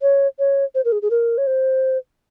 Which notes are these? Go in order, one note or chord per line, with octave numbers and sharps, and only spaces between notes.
C#5
C#5
C5
A#4
G#4
G#4
A#4
C#5
C5